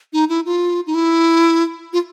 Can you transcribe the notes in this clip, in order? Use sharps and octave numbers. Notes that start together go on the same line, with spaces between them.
D#4
E4
F4
D#4
E4
F4